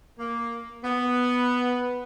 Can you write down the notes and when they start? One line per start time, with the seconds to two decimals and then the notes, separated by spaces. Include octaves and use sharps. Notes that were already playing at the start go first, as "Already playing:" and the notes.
0.19 A#3
0.84 B3